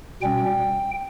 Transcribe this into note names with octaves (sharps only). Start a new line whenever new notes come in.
B2 G3 C#4 G5